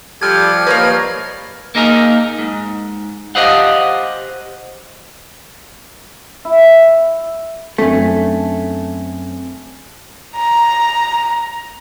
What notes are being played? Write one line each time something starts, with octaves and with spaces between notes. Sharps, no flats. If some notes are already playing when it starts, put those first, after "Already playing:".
F3 G3 G4 A4 D6 F6 G#6
A#3 A#4 B4 C#5 D#5
A#3 D#4 G#4 A#4
G#2
G4 C5 D#5 F5 F#5
E4
F#2 A3 C4 D4 G#5
A#5